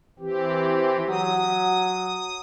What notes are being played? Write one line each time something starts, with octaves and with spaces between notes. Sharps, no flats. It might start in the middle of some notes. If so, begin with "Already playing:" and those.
E3 C4 G4
F#3 D#6